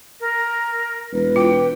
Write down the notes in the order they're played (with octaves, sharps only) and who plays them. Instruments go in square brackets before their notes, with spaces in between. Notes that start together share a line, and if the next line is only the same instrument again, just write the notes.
[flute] A#4
[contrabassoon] E1 [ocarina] B4
[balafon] F4 [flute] G5